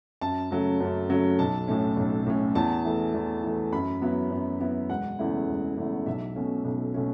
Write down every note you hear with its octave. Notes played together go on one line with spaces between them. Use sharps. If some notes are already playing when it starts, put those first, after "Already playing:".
F#2 A5
C#3 F#3 A3
F#2
C#3 F#3 A3
B1 A5
A2 A3 C#4
B1
A2 A3 C#4
E2 A5
E3 A3
E2
E3 A3
F#2 B5
F#3 B3 E4
F#2
F#3 B3 E4
E1 F#5
E2 C#3 A3 E4
E1
E2 C#3 A3 E4
B1 E5
B2 A3 C#4
B1
B2 A3 C#4